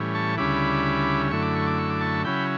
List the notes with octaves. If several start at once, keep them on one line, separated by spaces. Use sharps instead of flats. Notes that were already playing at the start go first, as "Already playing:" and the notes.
Already playing: A2 E3 G3 C#4
A5 C#6
D2 C#3 G3 C#4 E4 B5 D6
F#2 D3 A3 E4 C#6
D6
C#6
D6
C#6
D6
A5 C#6
C#3 F#3 C#4 E4 G5 B5